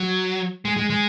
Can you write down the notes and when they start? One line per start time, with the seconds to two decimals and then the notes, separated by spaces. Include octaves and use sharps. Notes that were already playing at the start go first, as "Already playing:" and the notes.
Already playing: F#3
0.65 G#3
0.77 G#3
0.90 G#3